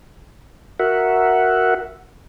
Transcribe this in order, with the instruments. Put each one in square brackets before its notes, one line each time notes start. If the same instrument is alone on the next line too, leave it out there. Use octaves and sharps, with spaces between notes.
[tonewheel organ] F#4 A#4 E5 F#5